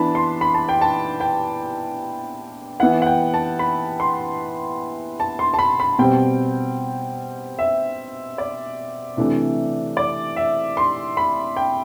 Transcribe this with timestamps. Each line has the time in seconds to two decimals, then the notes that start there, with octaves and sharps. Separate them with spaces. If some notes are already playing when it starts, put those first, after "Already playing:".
Already playing: E3 B3 D4 A5 B5
0.15 C6
0.41 B5
0.54 A5
0.69 G5
0.81 A5
1.20 G5
2.80 E3 B3 E4 F#5
3.02 F#5
3.06 G5
3.34 A5
3.59 B5
4.00 C6
5.20 A5
5.39 C6
5.54 A5
5.59 B5
5.80 B5
5.99 B2 G3 C4 G5
7.59 E5
8.38 D5
9.17 C3 E3 A3 D4
9.97 D5
10.36 E5
10.77 C6
11.17 B5
11.57 G5